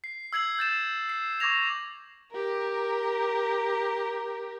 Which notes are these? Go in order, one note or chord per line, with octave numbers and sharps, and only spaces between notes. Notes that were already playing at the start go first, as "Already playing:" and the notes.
C7
E6 G#6 C7 F#7
G6 A6 E7 F#7
C7
C#6 D6 G#6 A#6 F7
G4 A#4